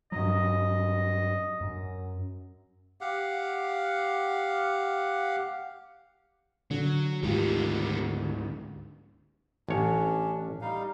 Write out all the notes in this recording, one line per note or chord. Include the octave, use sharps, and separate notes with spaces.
G2 F#3 D#5
F#2
G4 F5 F#5
D3 F#3
D2 G#2 D#3 B3 F4 G4
A1 C#4 D4 C#5
G3 D#4 F5